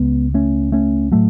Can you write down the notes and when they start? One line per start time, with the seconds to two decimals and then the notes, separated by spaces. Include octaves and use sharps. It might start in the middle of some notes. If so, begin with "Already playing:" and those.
Already playing: C#2 C#3 G#3 B3
0.34 A3 C#4
0.72 A3 C#4
1.12 A2 F#3 A3